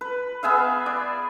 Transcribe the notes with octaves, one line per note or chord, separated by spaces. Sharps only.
B4
B3 G#4 E5 F5
D5